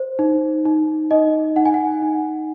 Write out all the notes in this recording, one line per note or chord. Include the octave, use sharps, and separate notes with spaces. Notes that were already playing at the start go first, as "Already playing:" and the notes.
Already playing: C5
D#4
D#4
D#4 D#5
D#4 F#5
G#5
F#5
D#4